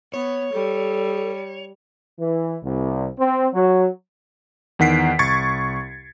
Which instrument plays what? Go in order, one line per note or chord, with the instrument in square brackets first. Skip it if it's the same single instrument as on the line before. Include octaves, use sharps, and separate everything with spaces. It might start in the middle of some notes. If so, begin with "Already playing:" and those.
[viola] B3 [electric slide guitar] C#5
[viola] G3 [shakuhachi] A4
[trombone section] E3
C2
C4
F#3
[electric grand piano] E2 D#3 F#5 B6 C7 D7
C2 C#6 G#6 A6 C#7